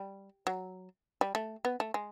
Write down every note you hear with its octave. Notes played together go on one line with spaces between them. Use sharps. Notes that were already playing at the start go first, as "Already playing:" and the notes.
Already playing: G3
F#3
G3
A3
B3
A3
G#3